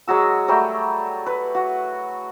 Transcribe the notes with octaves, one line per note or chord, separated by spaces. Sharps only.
F#3 G#3 F#4 E6
F#3 G3 A3 G5
B4
F#4